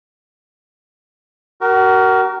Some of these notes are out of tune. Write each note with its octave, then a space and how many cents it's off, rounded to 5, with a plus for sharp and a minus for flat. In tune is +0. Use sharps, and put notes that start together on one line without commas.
F#4 +35 A#4 +0